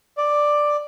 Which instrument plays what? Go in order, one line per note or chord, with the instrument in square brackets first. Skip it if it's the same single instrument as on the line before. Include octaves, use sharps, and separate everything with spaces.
[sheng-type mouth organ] D5